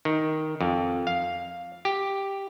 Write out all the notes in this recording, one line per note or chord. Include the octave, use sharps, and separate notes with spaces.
D#3
F2
F5
G4